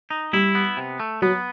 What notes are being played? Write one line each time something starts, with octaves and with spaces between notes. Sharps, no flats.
D#4
G3 E4
B3
C3
A3
F#3 B3